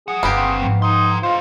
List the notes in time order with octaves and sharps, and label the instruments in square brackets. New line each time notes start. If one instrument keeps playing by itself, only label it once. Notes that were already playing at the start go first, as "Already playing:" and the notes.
[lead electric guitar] F#3 F#5 [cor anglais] G#4
[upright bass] G1 [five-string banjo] A#3 B3 G4
[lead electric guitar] D#3 C4
[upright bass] G#2 F3
[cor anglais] D#4 [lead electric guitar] A4 C6
[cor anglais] F4 [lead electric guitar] C5 D#5